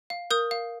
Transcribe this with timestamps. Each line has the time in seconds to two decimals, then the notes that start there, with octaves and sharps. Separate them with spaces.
0.10 F5
0.31 A#4 D#6 G6
0.51 F5